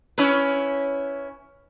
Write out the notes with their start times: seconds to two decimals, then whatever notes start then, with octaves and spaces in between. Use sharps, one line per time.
0.18 C#4 E4 B4